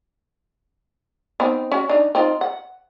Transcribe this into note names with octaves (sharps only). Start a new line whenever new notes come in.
B3 C4 D#4
C#4 F#4
D4 D#4
C4 D#4 F4
F#5